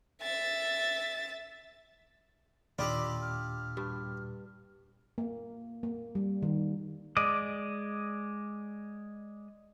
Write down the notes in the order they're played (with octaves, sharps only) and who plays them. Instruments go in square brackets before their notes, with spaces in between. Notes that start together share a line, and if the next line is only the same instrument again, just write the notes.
[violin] E5 A6
[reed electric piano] D#2 A#2 E6 [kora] D4 D#5 [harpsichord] F4 G4 [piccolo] B5
[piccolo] F6
[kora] G2
[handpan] A#3
A#3
G3
D#3
[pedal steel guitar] G#3 D5 D#5